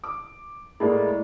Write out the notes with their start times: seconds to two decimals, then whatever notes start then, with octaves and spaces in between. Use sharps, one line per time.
0.04 D6
0.80 A2 G#3 A#3 E4 D5